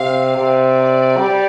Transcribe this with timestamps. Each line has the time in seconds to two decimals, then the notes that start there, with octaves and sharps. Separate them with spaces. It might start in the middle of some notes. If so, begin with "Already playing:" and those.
Already playing: C3 F5
0.37 C3 D5
1.18 G3